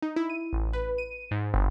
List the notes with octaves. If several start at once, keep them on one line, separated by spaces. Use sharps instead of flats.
D#4
E4
D#7
A1
B4
D#7
G#2
G1